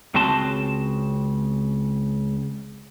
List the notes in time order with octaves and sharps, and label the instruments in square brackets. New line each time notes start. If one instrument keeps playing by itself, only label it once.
[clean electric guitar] C#2 C#3 C4 F#4 A5 C6